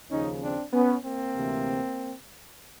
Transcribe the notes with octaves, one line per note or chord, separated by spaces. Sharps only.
D#2 C#3 F3 C#4 D#4
C4 D4
B3 C#4
A#3 C4
D2 C3 E3 A3